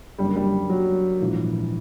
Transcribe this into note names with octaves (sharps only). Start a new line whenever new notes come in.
F#1 F#2 D3 G3
G3
F#3
A#1 G#2 E3